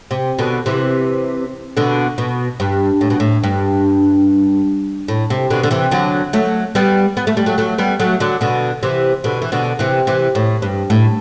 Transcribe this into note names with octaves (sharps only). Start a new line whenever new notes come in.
C3
B2 D3
C3 E3
B2 D3
B2
G2
A2
B2
A2
G2
A2
C3
B2 D3
D3
C3 E3
D3 F#3
F#3 A3
G3 B3
B3
A3
G3
F#3 A3
F#3 A3
G3 B3
F#3 A3
D3 F#3
B2 D3
C3 E3
B2 D3
E3
B2 D3
C3 E3
C3 E3
A2
G2
A2